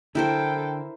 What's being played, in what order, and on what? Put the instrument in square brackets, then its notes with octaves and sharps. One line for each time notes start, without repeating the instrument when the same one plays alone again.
[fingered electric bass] D3 [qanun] E4 A#4 C5 [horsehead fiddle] A4 G5